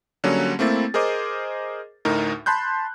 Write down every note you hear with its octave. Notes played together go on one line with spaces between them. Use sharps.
D3 F#3 G3 A#3 C#4
A3 A#3 C4 E4 A6
G#4 A#4 C5 D#5 D6
D2 A2 D#4 A#4
A5 B5 C6 F#6 G6